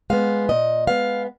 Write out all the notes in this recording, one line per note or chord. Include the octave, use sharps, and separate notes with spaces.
G#3 B3 F5
A#2 D#5
G#3 B3 F5